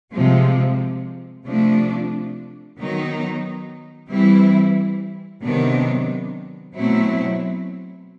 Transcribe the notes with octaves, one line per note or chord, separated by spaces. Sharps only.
C3 F3 G#3
C3 F3 A3 D4
D#3 F#3 B3 D#4
E3 G3 C4 E4
C3 D#3 F#3 B3 D4
B2 F#3 A3 C4 E4